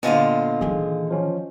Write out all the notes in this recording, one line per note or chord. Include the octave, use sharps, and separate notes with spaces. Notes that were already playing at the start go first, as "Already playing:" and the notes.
A#2 D3 B3 F4 C5 D#5
D#3 E3 G#4
F3 C#4